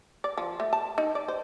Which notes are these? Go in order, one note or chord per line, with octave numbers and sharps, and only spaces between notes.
D5
F3
A3
A5
D#4
D5
C5